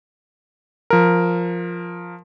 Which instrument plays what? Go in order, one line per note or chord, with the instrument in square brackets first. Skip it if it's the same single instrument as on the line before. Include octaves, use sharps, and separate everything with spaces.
[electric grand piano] F3 A#4